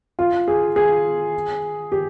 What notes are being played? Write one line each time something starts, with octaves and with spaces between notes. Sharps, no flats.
F4
G#4
G#4
G4